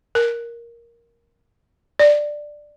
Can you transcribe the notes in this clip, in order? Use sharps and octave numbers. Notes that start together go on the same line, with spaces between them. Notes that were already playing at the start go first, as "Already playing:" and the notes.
A#4
D5